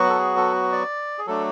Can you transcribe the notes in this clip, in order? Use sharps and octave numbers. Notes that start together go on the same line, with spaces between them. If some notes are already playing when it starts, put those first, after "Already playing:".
Already playing: F#3 B3 F#4
A4
G#4
A4
D5
G#4
F#3 A3 D4 A4